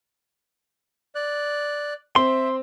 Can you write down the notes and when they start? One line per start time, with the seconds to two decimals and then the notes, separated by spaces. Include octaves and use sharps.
1.15 D5 F#6
2.16 C4 E5 C6